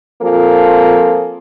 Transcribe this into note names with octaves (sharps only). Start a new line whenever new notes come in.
F3 A#3 C4 F4 G#4 A4